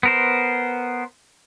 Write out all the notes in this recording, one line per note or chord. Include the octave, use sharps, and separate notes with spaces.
B3 A#4 C5